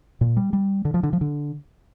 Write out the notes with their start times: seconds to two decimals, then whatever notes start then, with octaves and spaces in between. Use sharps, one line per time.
0.21 A#2
0.37 G3
0.53 G3
0.85 D3
0.94 F3
1.03 D3
1.13 F3
1.21 D3